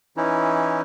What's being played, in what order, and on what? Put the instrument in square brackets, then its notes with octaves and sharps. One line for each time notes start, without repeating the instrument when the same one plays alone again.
[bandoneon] E3 C#4 D#4 E4